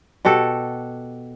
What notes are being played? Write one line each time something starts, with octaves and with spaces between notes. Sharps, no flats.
B2 F#4 G4 A4